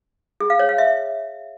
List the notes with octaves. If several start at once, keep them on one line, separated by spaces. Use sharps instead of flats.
G#4
F5
C#5
F5
E5